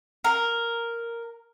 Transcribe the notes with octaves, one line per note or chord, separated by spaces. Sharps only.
A#4